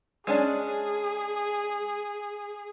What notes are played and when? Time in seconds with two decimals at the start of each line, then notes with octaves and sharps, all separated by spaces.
0.27 G#3 C#4 D4 G#4